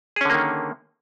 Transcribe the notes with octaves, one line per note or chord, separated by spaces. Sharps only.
D3 D#3 A#3 C#4 G#4